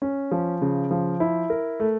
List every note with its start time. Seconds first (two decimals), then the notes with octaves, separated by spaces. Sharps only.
0.02 C#4
0.31 F3
0.62 C#3
0.91 F3
1.20 E4
1.50 A#4
1.80 A3